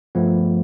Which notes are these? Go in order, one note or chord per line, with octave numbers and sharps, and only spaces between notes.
G2 F3 A3 B3